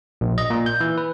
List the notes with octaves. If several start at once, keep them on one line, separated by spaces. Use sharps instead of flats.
A#1
D#5
A#2
G6
E3
B4